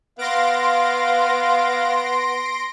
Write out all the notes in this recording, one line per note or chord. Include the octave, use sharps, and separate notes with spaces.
B3 F5 C6 A#6 D7